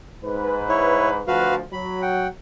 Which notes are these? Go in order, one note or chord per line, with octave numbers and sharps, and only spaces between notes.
G#2 B4
E4 C#5
D2 F3 F#4 B4 F5
F#3 B5
F#5 G5